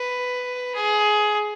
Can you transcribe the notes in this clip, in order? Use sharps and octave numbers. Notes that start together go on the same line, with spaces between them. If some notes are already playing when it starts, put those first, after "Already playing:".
Already playing: B4
G#4